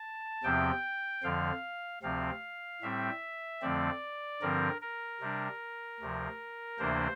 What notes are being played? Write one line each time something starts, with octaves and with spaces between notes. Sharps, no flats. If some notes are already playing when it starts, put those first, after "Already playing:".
Already playing: A5
E2 C3 F3 C4 G5
F2 D3 F3 F5
D2 C3 F3 C4 F5
A2 G3 C4 E5
F2 D3 F3 A3 C4 D5
G2 D3 F3 C4 A#4
A#4
C3 G3 D4
D2 C3 F3
D2 C3 E3 A#3 D4 C5